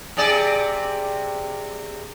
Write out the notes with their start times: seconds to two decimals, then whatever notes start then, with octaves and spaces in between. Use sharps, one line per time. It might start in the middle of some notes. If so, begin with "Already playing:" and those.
0.17 C3 G#4 D5